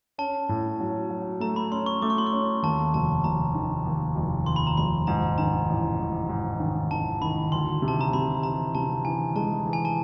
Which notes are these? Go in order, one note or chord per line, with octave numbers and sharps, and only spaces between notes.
C#4 A5
A2
F#3
F#3
A3 A#5
B5
C#4 C6
C#6
A3 D6
C#6
C6
C#6
C#4
D#2 A5
F1 A5
F1 A#5
D#3
D#2
F1
D#2 C6
B5
A#5
F1 B5
G#2 A#5
D#3 A#5
A1
G#2
G#2
D#3
D#3 A5
D#3 B5
D2 C6
C3
A5
A#5
C3 B5
E3 A#5
C3 A5
E3 G#5
G#3 A5
E3
G#5
A5